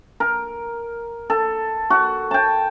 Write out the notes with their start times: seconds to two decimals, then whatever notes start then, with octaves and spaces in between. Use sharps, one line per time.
0.20 A#4
1.30 A4
1.90 F#4
2.31 G5 A5